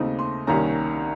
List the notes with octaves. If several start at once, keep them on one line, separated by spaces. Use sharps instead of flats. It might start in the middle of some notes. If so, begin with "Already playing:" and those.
Already playing: D#2 C#3 A3 C4 D#4
C6
C2 C3 D#3 A#3 C#4 A#5